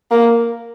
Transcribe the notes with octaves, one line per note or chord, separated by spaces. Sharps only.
A#3